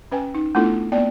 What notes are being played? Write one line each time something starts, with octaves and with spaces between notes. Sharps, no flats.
C#4 B4 G5 G#5
D#4
A3 B3 D4 E4 F4 A4
A#3 B3 D5 G5